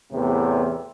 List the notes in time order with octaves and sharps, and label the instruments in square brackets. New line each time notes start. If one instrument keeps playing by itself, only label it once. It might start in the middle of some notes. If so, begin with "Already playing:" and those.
[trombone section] E2 A2 C3